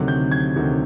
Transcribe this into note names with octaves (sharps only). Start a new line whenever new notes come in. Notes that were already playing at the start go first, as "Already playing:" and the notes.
Already playing: D2 C3 D#3 F#3 F#6
G6
G#6
D2 C3 D#3 F#3